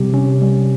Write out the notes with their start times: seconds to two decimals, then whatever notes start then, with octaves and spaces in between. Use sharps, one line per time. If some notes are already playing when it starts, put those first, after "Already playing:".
Already playing: C3 G3 G4
0.14 C#4
0.42 G3